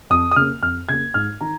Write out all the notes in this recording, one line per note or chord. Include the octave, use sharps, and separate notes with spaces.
F2 D#6
D#6
C#3 A#3 F6
F2 F6
C#3 A#3 G#6
G#2 F6
D#3 A#5